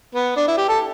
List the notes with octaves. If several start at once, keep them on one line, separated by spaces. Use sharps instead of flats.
B3
D4
E4
G4
A4